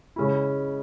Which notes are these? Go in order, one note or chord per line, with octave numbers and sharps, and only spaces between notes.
C#3 G#3 C#4 E4